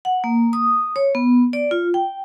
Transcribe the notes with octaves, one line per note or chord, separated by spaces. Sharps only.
F#5
A#3
D#6
C#5
B3
D5
F4
G5